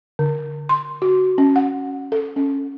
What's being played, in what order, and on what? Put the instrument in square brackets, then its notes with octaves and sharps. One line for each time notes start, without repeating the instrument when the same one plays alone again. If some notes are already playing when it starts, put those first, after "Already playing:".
[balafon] D3
C6
F#4
C#4
F#5
A4
C#4